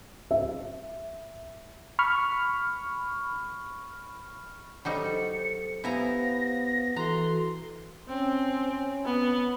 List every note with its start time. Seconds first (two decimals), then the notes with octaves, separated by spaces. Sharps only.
0.31 E5
1.99 B5 C#6 F6
4.85 F#3 G3 D#4 A4 C5 C#7
5.84 B3 E4 G4 C5 F5 G#5 A#5 A#6
6.96 E3 F#4 A4 A#5 C6
8.08 C4 C#4
9.05 B3